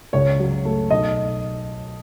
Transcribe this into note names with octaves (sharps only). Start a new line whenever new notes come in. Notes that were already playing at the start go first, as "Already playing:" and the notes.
C#2 C#5
F#3
A3
B1 D#5